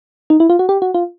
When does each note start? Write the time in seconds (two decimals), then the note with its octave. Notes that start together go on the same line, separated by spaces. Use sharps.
0.30 D#4
0.40 E4
0.50 F4
0.59 F#4
0.69 G4
0.82 F#4
0.94 F4